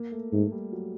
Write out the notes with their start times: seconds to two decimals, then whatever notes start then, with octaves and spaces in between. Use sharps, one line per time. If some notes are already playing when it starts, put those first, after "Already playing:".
Already playing: A#3
0.11 A3
0.32 G#2 A3
0.52 G3
0.72 F#3